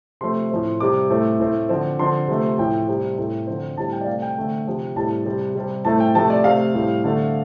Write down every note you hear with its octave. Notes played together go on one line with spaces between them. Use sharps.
C3 F3 A3 C4 C6
A2 F3 C4
C3 G3 C4 D6
A2 A3 C4
A2 A3 C4
D3 F3 C4
D3 F3 C4 C6
C3 F3 A3 C4
A2 F3 A3 C4 G5
C3 G3 C4
A2 A3 C4
D3 F3 C4
A2 G3 C4 A5
G5
D5
C3 A3 C4 F5
G5
D3 A3 C4
C3 F3 C4
A2 G3 C4 A5
C3 G3 C4
C3 G3 C4
A2 A3 C4 A5
G5
C3 F3 A3 C4 A5
D5
C3 A3 C4 F5
A2 G3 C4
D3 A3 C4